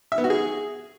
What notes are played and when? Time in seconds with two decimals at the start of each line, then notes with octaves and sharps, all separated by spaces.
0.12 E5
0.18 B3
0.24 F#4
0.30 G#4